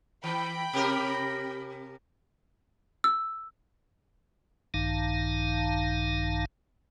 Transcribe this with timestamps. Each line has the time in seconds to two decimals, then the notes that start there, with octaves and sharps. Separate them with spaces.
0.24 E3 G5 B5
0.73 C3 G4 A#4
3.04 E6
4.74 A#1 G2 D#3 D#4 F5 A5